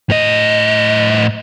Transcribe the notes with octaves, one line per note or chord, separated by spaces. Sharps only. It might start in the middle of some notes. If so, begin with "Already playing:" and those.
A2 D#5